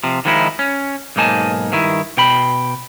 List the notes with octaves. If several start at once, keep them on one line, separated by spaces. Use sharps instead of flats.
C3 F3
D#3 F3 G#3 D#4 E4
C#4
B1 G#2 A#3 D#4 G#5 A5
G2 D#3 E4
B2 G5 B5